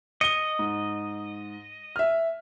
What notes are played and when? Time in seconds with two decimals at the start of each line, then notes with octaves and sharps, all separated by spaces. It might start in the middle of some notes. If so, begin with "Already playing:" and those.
0.21 D#5 C#7 G7
0.59 G#2
1.96 E5 F6